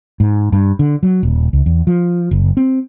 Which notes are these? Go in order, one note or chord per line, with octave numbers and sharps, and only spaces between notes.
G#2
G2
D3
F#3
D#1
C#2
E2
F3
F#1
C4